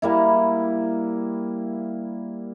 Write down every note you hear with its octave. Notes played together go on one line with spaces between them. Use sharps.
G3 A#3 E4